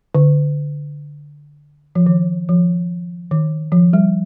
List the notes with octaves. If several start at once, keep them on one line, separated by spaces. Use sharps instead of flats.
D3
F3
D#3
F3
D#3
F3
G3